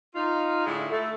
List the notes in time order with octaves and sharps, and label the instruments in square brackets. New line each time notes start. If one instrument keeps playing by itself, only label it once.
[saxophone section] D#4 F4
A2 D3 G#3 E4 E5
A3